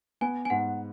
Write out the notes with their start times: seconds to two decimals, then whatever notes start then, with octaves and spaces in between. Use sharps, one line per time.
0.21 B3 G#5
0.45 G#5
0.50 G#2 F#5